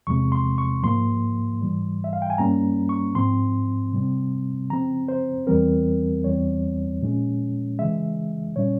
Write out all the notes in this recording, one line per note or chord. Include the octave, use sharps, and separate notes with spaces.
E2 C3 F3 G#3 C4 C#6
C6
C#6
G#2 F3 A#3 C6
G#2 E3 G3
E5
F5
G5
G#5
G2 G3 A#3 C#4 A#5
C#6
G#2 F3 C4 C6
C3 G3 C4
C#3 F3 C4 A#5
C5
E2 E3 G3 C4 A#4
E2 E3 G3 C4 C#5
A#2 F3 G#3 C#4
C#3 E3 G#3 E5
A#2 G3 C#4 C#5